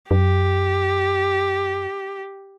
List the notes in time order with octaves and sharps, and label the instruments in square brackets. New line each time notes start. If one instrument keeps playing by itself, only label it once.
[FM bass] F#2 [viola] G4